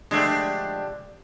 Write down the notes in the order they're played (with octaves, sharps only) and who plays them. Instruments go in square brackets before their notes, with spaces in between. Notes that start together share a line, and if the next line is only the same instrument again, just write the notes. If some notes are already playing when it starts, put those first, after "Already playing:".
[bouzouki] D3 F3 [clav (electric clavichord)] G#3 A3 [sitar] D4 G4